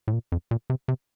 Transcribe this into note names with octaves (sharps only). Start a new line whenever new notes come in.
A2
A#2
F2
A#2
C3
C3